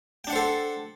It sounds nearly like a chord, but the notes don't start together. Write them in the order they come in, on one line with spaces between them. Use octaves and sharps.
G5 D4 F#5 C5 A4